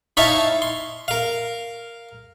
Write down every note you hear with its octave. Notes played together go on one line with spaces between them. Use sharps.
D#4 E4 C#5 E5 F5 A5
C6
A#4 F5